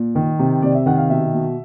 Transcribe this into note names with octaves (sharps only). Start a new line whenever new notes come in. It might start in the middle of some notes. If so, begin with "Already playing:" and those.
Already playing: A#2
D#3
C3
C3 D5
E5
D#3 F#5
F5
B2 E5
B2